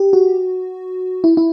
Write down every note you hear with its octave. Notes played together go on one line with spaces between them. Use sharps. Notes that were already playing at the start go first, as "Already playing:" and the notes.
Already playing: G4
F#4
E4
E4